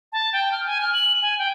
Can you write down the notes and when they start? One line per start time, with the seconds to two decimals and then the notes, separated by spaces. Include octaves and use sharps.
0.12 A5
0.33 G5
0.52 F6
0.66 G#5
0.81 F6
0.93 F#7
1.22 G#5
1.39 G5